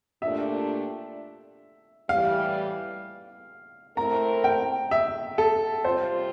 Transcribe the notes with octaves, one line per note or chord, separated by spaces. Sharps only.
A#2 A3 D4 G4 E5
A2 E3 G3 F5
A3 C4 E4 A#4 A#5
G5
E5
A4
C3 G3 C4 F4 C5